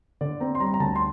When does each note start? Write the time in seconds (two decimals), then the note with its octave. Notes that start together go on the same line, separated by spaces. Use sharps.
0.21 D3 D5
0.40 C4 A#5
0.55 C6
0.60 G3 A#5
0.74 A#5
0.80 D2 A5
0.96 C6